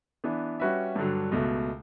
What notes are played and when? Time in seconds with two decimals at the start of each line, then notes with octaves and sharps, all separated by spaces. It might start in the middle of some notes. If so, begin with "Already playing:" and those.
0.24 E3 B3 D4
0.60 G3 C#4 F#4 B4 E5
0.96 G2 D3 F#3
1.32 C#2 B2 A3